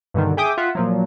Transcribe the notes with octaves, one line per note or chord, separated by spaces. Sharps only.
G2 B2 D3 D#3
G#4 E5 G5 D6 D#6
F4 E5 F#5
A#2 F3 F#3